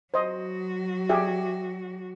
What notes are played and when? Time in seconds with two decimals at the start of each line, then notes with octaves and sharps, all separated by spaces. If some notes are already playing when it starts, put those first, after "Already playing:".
0.14 F#3 F#4 C5 D#5
1.09 G4 G#4 E5